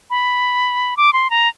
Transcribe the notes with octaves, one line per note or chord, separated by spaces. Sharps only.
B5
D6
C6
A#5